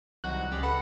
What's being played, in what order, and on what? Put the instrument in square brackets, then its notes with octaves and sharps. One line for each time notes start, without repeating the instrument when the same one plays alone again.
[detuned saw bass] C2 [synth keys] D#3 F#3 D#4 [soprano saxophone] F#4 [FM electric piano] F#6
[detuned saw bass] C#2 [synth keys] C#3 G#3 D5 [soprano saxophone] G4
[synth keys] A4 [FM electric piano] B4 [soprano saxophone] F#5